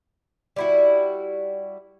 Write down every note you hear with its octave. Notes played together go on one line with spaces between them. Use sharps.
G3 E4 F#4